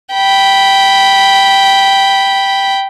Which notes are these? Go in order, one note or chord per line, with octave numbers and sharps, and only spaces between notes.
G5 B5